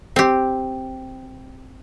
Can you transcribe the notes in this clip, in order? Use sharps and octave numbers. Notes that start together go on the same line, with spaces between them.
C4 G4